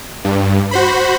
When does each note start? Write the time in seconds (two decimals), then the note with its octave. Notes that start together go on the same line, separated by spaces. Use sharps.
0.25 G2
0.71 F#4 C5 B5